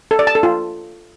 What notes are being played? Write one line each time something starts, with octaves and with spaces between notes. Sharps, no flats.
A4
D5
A5
A4
F4